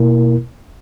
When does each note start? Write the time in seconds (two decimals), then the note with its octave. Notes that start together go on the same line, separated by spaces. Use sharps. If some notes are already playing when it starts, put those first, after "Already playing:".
Already playing: B2 A#3 E4 A#4